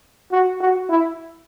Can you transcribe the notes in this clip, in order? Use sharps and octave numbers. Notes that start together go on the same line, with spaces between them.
F#4
F#4
E4